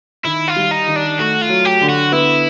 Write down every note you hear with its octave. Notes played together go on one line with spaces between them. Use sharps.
D#3 E4
F4
G3
D#4
D#3
D4
A3 F#4
F4
F#3
G4
D3
F#4
B3 E4